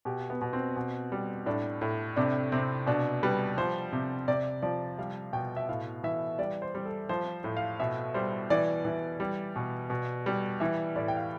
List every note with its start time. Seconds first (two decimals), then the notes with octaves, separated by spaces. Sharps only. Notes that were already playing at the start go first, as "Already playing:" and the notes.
0.05 B2 G4
0.30 B3
0.41 B2
0.53 C4
0.76 B2
1.12 G3
1.46 A2 D4
1.81 A2
2.16 C3 D4
2.52 C3 C4
2.87 B2 D4
3.23 G3 B4
3.57 F3 C5
3.93 C3
4.28 C3 D5
4.62 F3 D5
4.98 G3 F5
5.33 B2 G5
5.56 E5
5.69 A2 F5
6.04 E3 E5
6.39 G3 D5
6.62 C5
6.75 G3
6.85 A4
7.09 F3 C5
7.44 A2
7.57 F5
7.80 B2 E5
8.14 G3 C5
8.50 E3 D5
8.85 E3
9.20 G3
9.56 B2
9.90 B2
10.26 G3
10.60 E3 E5
10.96 A2 D5
11.08 G5
11.17 F5